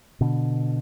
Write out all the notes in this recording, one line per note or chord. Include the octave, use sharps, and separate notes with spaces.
B2 D3